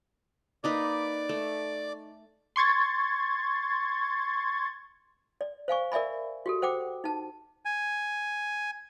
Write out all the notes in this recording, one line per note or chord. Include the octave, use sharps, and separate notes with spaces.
A#3 D#4 B4 D5 D6
A3
C6 C#6 G#6 A6
D5
C5 F5 G#5 C#6
A#4 D5 E5 G#5 B5
F#4 G4 A4
C5 F#5 G5 D6
D#4 A5
G#5